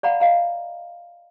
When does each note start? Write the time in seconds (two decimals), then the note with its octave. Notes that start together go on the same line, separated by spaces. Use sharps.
0.03 D5 F5 F#5 A#5 B5
0.20 D#5 F5 A#5